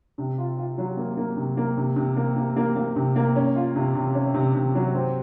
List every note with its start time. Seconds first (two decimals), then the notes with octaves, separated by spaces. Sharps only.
0.18 C3
0.38 F4
0.57 F4
0.78 F#3
0.97 A#3
1.17 A#3
1.37 C3
1.57 A#3
1.77 C3
1.96 C3
2.16 A#3
2.36 A#3
2.56 A#3
2.76 A#3
2.96 C3
3.16 A#3
3.36 C#4
3.56 F4
3.76 C3
3.95 C3
4.15 C#4
4.34 C3
4.54 C3
4.75 F#3
4.94 C4